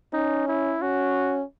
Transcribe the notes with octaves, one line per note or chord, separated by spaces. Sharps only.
C#4 D#4
E4
C#4 F#4